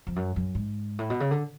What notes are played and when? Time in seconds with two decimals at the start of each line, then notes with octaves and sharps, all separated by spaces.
0.07 F2
0.16 F#2
0.36 F#2
0.55 G#2
0.99 A2
1.10 B2
1.20 C#3
1.31 D3